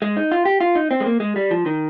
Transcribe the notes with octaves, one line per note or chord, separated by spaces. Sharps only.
G#3
D#4
F4
G4
F4
D#4
C4
G#3
A#3
G#3
G3
F3
D#3